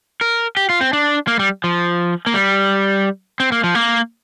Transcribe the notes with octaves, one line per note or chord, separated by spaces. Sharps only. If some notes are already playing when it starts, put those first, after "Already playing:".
A#4
G4
F4
C4
D4
A#3
G3
F3
A#3
G3
C4
A#3
F3
A#3